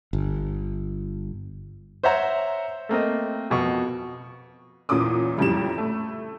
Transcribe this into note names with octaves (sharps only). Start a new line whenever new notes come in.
G1
C5 C#5 E5 F#5 A#5
A3 A#3 C4 D#5
F2 B2 C#6
E2 A#2 E3 C#4 D6 D#6
F#1 F2 A2 G3 G4 E7
A3